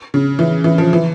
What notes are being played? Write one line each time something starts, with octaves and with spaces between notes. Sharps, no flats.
C#3
E3
E3
F3
E3